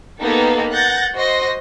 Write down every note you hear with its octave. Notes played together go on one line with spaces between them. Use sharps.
A#3 B3 D#4 G4 A4
F#5 F#6 G6 A6 A#6
F#4 C5 D#5 C6 A#6